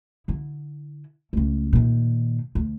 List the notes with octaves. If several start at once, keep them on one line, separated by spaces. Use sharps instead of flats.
D3 E4
C#2 A3
A#2 D#3
D2